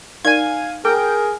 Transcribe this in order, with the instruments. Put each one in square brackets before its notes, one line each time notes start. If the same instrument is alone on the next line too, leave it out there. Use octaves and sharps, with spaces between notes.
[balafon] D#4 A#4 D5 [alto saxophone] F5 [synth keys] G#5 G#6
[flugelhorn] G#4 [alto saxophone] A#4 [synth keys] G5 [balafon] D6